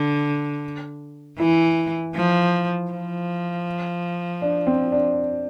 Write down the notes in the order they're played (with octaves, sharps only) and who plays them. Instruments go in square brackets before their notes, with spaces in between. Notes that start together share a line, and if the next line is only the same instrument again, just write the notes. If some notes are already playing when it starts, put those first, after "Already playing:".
Already playing: [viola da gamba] D3
[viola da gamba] E3 [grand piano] E4
[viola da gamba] F3
F3
[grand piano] D4
C4
D4